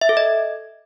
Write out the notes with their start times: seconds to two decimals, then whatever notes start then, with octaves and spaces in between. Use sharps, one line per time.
0.01 E5
0.09 A4
0.17 D#5